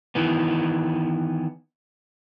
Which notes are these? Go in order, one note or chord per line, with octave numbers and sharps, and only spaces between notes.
D#3 E3 B3